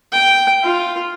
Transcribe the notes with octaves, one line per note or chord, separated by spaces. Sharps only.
G5
F4